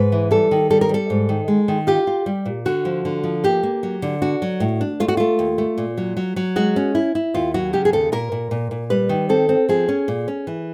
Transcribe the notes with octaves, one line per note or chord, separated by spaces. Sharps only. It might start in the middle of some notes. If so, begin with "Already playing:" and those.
Already playing: G#2 B4
E3
G3 A4
D#3
G3 A4
A#4
G3 A4
G#2
D#3
G#3
D#3
F4 G4
F4
G3
A#2
D3 F#4
F3
D3
F3
A#3 G4
A#3
F#3
D3
D4 F#4
F#3
A2
D4
A3 F4
F#4
A3 F4
D#2
A3
A#2
F#3
F#3
F#3
G#3 F#4
C#4
E4
E4
D#2 F4
F#3 F#4
C#3 G4
G#4
D#2 A4
A#2 A#4
A#2
A#2
A#2
G3 B4
D#3
C4 A4
C4
F3 G#4
C#4
A#2
C#4
E3